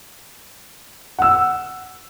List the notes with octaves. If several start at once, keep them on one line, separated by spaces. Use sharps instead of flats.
F#5 E6